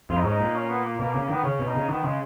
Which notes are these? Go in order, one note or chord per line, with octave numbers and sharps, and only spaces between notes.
F2 F4
D#4
G#2 C#4
D#4
A#2
C#4
B3
A#3
B2 A#3
A#3
C#3
A#3
D#3 B3
C#3 C#4
B2
D#4
C#3
D#3 B3
C#3 G#3